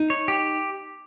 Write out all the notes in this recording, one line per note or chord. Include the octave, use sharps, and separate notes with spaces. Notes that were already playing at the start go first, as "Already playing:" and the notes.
Already playing: D#4
C#5
G4